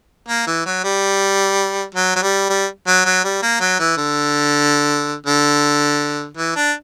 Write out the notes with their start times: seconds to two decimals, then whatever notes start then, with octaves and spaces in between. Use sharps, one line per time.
0.29 A#3
0.47 E3
0.66 F#3
0.84 G3
1.95 F#3
2.16 F#3
2.22 G3
2.50 G3
2.87 F#3
3.06 F#3
3.24 G3
3.42 A#3
3.61 F#3
3.79 E3
3.97 D3
5.27 D3
6.37 E3
6.56 D4